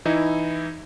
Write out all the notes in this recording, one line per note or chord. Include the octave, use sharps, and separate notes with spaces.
E3 D#4 E4